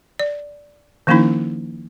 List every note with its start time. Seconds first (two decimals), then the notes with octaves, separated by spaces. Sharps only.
0.19 D5
1.07 D#3 F3 A#3 C#4 D#4 E4